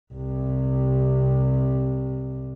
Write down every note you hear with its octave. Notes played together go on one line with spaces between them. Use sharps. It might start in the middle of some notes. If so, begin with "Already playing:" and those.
C2 C3